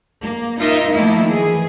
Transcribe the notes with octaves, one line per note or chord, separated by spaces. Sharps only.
A#3
D#4 F4 A#4 D#5 E5
D#3 F3 A3 A#3 E4
E3 G#4